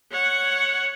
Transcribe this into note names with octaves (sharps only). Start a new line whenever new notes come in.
C#5 F#5